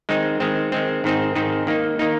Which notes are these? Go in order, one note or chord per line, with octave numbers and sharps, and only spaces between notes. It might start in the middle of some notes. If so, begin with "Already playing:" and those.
D#3 G#3 C4 D#4
D#3 G#3 C4
D#3 G#3 C4
G#2 D#3 C4 D#4
G#2 D#3 C4 D#4
D#3 A#3 D#4
D#3 A#3 D#4